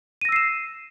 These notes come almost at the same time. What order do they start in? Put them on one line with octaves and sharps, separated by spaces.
D#7 A#6 E6 C7 E7